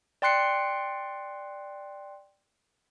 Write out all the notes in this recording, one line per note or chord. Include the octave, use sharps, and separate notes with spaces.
D5 G5 C6 F#6 C7 C#7